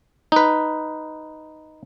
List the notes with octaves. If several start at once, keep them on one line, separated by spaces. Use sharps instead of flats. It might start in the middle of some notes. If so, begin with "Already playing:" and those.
D#4 B4